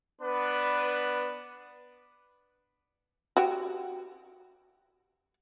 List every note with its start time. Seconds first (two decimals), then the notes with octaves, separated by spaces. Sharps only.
0.20 B3 D4 B4
3.37 F#4 G4